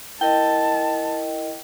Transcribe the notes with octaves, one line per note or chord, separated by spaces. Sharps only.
E4 A#4 D#5 G5 A5